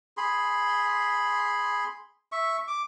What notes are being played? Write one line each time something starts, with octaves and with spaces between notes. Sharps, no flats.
G#4 B5 C6
E5 C#6
D6